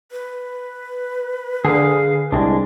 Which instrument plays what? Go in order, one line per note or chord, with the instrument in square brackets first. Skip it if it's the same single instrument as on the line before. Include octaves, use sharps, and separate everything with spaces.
[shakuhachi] B4
[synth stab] D3 [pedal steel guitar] G#4 F5
[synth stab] C2 [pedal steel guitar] G#3 D4